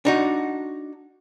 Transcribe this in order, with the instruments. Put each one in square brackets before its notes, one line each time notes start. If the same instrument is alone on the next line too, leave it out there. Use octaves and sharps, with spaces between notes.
[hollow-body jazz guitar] D4 D#4 F#4